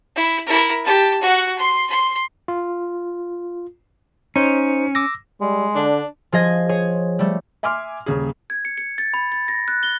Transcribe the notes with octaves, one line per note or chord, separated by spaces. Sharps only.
E4
E4 A#4
G4 A5
F#4 F#5
C6
C6
F4
C#4 D#4 C5
D6 E6 A#6
G3 G#3
D3 D4
F3 G#4 D#5 G#6
G#4 C#5
G3 A3
E5 G#5 C6 D6 F6
D#1 C#3 G#4
G#6
C#7
C#7
A6
B5
A6
A#6
F#6
G7